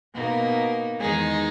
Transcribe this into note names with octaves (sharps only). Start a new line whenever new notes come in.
B2 A#3 D#4
E2 D#3 G#3 D#4 G#4